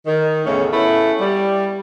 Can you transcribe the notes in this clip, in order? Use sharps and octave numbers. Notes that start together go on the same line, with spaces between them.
D#3
E2 A2 C#3 A3 C#4
A3 B3 C#4 E4
G3